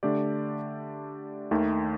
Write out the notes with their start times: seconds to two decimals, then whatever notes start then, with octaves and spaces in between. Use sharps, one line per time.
0.03 D3 A3 D4 G4 D5
1.51 D#2 D#3 A3